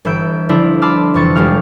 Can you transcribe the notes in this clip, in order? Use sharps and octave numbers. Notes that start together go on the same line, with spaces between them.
G1 E3 E5 G6 D7
D3 F3 D4 E4 F4
A5 B5 C6 D6 E6 F6
F2 C3 E3 C#6 A6
F1 G3 G#3 G4 F5 F6